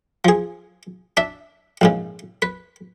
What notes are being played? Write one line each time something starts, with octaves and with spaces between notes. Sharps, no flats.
F3 G#4
D4 E5
A#1 G#2 C#3
B4